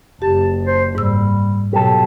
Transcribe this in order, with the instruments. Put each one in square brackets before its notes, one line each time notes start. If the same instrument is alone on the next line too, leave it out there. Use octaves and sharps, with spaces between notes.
[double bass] F#1 [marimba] G4 [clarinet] A5
[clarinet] C5
[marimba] G#2 E6 [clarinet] G3
[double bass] B2 F#3 [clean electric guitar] G4 A4